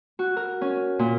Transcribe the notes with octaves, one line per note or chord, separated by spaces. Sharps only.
F#4
A#4
C#4
A#2